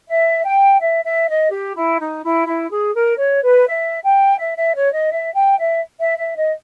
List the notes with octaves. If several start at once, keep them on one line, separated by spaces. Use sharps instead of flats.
E5
G5
E5
E5
D#5
G4
E4
D#4
E4
E4
G#4
A#4
C#5
B4
E5
G5
E5
E5
C#5
D#5
E5
G5
E5
E5
E5
D#5